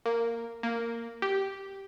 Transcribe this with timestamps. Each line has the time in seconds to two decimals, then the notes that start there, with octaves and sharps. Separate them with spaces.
0.06 A#3
0.63 A#3
1.22 G4